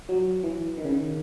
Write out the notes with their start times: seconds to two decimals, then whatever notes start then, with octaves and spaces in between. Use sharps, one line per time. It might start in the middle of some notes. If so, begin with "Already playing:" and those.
0.09 F#3
0.43 E3
0.77 D#3
0.85 C#3
0.93 D#3